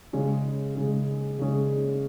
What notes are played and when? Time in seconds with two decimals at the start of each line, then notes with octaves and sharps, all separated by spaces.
0.13 C#3 G#3 C#4 G#4
0.75 C#3 G#3 C#4 G#4
1.39 C#3 G#3 C#4 G#4